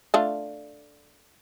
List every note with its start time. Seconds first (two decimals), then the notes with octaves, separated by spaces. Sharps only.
0.14 A3 D4 F4